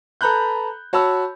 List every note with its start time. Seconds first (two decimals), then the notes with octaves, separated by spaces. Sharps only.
0.21 A4 B4 A#5 B5 F#6 G6
0.93 F#4 C#5 A5 B5 E6